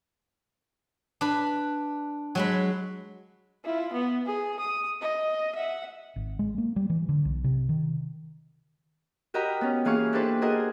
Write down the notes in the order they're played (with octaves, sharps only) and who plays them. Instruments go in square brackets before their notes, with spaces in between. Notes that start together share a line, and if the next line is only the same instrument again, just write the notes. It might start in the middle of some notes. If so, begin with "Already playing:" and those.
[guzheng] D4 B4
F#3 G#3 B5
[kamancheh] E4 F4
B3
G#4
D#6
D#5
E5 F#5
[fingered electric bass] G#1
G#3
A#3
G3
E3
D3
B1
C3
D#3
[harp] F#4 G4 A#4 D#5 A#5 B5
B3 C#4
E3 A#3 G#4 F5 C#6
D4 E4 G4 A4 B4 C5
F#4 G#4 A#4 D#5 G#5